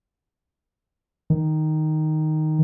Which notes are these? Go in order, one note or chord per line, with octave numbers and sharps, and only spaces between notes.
D#3